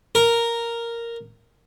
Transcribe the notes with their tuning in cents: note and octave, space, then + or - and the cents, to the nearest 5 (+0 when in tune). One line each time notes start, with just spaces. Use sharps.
A#4 -5